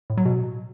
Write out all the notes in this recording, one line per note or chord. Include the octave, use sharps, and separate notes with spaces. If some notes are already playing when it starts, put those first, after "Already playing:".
A2
F#3
B2